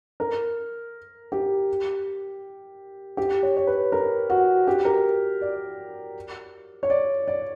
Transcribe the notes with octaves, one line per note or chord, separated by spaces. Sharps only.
A#4
G4
G4
C#5
C#5
B4
A#4
F#4
G4
A#4
D5
C#5
D5
D5